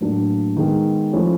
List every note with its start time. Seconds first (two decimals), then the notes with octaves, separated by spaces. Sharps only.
0.01 A2 F#3 A#3 D4
0.56 D#3 G#3 B3
1.13 F3 A3 C#4 E4